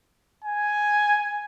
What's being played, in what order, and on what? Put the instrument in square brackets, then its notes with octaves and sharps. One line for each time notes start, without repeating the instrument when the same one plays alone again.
[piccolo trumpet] G#5